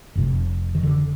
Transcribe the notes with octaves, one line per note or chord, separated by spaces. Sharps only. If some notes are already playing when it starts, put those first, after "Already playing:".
F1 F2 C3
D#3
D3